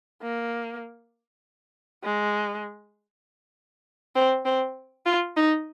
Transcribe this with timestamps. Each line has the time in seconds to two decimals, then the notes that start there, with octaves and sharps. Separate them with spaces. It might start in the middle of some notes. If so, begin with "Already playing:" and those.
0.23 A#3
2.04 G#3
4.15 C4
4.45 C4
5.06 F4
5.37 D#4